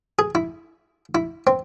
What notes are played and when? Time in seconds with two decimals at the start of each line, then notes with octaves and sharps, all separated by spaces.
0.19 G#4
0.35 E4
1.15 E4
1.47 C4